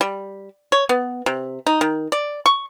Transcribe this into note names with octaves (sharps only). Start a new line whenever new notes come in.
G3
C#5
B3
C3
D#4
D#3
D5
C#6